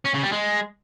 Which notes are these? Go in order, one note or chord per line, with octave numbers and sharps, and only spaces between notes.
C#4
C#3
G3
G#3